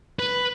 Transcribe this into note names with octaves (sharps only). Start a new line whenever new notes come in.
B4